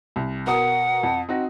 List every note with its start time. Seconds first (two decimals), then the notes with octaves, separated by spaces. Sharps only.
0.16 C2
0.47 B2 A#4 F#5 D#6
1.03 F2
1.29 C4 D#4 F#4